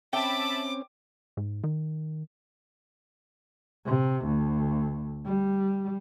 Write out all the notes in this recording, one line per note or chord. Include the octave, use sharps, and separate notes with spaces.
C4 C#4 E5 G5 A5 B5 D6
G#2
D#3
C3
D2
G3